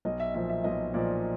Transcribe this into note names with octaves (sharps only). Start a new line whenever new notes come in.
B1 D#5
E5
A#2 F3 E5
E5
B1 D#5
A#2 F3 D5